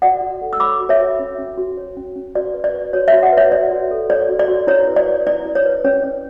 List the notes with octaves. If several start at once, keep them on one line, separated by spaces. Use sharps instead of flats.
F#4 D5 F#5
F#4
A4
E6
C#5 B5 D6
F#4
C#5 E5
F#4
C#4
C#4
F#4
C#5
C#4
C#4
F#4 D5
B4
D5
B4
F#4 C#5
F#4 C#5 E5
D5 F#5
B4
C#5 E5
F#4 D5
F#4
A4
C#5 D5
F#4
D5
F#4
E4 C#5
B4
D5
B4
E4 D5
E4
C#5
B4
C#4 C#5
C#5